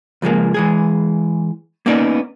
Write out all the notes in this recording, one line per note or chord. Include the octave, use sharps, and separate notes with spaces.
C#2 F3 G#3 A#3
E3 G#3 G#4
A#3 B3 C#4 D#4 D5